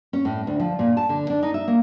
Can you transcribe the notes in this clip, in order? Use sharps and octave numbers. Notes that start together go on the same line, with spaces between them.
C#4
A2
D2
F3
A#2
A5
D3
D4
D#4
E5
A#3